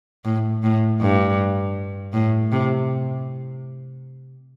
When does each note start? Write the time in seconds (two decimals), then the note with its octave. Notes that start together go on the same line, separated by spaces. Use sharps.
0.25 A2
0.63 A2
1.01 G2
2.13 A2
2.52 C3